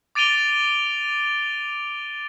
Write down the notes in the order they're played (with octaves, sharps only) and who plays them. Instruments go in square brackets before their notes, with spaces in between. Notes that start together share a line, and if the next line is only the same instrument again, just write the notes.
[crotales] D6 A6 D7 D#7 F7 G7